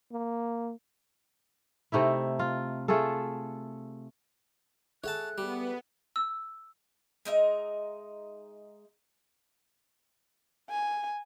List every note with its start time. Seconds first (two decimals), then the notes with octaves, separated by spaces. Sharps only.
0.12 A#3
1.92 C3 A3 D#4 E4
2.39 F4
2.88 A3 F4 G#4 A4
5.04 G#4 A4 C#5 E5 F#5 A5 F#6
5.38 G3 B3
6.16 E6
7.25 G#3 D#4 E5
10.70 G#5